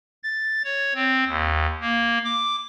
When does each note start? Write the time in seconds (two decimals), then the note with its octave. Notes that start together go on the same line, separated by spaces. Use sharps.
0.23 A6
0.64 C#5
0.95 C4
1.27 D#2
1.81 A#3
2.25 D6